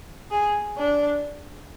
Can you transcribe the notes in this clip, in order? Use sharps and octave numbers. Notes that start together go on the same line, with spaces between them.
G#4
D4